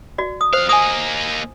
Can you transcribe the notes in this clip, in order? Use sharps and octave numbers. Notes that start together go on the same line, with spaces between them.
F#4 D5
D#6
F2 C5 F5
A#3 D#5 G#5 D#6